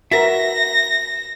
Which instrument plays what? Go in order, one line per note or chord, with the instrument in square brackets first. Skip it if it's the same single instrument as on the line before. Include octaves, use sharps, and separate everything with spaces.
[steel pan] F#4 A#4 B4 [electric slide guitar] E5 [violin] A#6